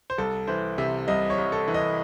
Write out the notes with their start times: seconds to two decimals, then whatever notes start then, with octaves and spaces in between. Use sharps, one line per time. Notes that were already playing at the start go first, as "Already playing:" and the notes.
0.10 C5
0.18 C2 A4
0.47 E3 C5
0.78 C3 E5
1.08 C2 D#5
1.30 C#5
1.38 C2
1.52 A4
1.68 E3
1.74 D#5